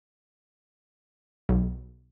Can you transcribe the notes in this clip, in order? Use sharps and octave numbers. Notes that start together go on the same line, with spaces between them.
B1